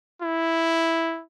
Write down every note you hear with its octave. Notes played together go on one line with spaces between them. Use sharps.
E4